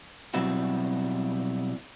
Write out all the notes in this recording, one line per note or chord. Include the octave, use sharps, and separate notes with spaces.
B2 F#3 G3 C4 E4 F#4